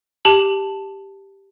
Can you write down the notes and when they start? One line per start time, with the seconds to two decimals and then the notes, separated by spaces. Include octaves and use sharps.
0.25 G4 A5 F#7